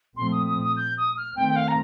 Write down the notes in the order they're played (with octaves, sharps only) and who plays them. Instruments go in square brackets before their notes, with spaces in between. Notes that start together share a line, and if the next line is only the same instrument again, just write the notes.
[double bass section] A#2 F3 A3 C4 [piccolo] C6
[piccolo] D#6
D#6
D#6
G6
D#6
F6
[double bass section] D#3 A3 C4 [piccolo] G5
[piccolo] G5
F5
A#5